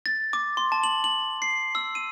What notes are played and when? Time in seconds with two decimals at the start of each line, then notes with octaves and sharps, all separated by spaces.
0.06 A6
0.33 D6
0.57 C6
0.72 A5
0.84 F#7
1.04 F#7
1.42 C7
1.75 E6
1.95 D#7